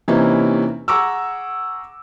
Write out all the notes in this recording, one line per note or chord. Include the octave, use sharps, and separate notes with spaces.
C3 E3 A#3 C#4 D#4 E4
G#4 F#5 A#5 C#6 D6 E6